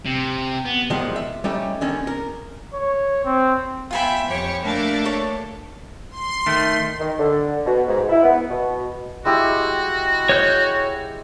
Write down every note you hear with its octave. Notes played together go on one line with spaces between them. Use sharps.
C3
B3
B2 D#3 F3 G3 G#3
E5
G3 A3 C#4 D#4 G4 C#5
D3 D#3 C#4
A#4
C#5
C4
B3 F4 E5 G5 G#5 B5
F2 G4 C#5
A3 A#3 D4
A4 C#5
C6
D#3 A3
D#3
D3
B2
G#2
E4
B3
B2
G#3 E4 F#4 G4
C#5 G6